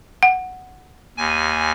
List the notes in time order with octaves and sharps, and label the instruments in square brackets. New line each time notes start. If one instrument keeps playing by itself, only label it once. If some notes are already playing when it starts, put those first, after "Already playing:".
[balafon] F#5
[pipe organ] D#2 G#5